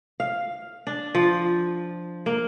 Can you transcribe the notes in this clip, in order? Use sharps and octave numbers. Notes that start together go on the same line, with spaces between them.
F5
D4
F3
A#3